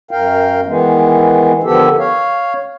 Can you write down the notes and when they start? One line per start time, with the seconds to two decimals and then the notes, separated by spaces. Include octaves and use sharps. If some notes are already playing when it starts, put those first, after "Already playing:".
0.11 F#2 A#4 F5 G5
0.66 D#3 E3 G#3 B3
1.63 D3 D#3 F3 B3 G4 A4
1.99 C#5 F5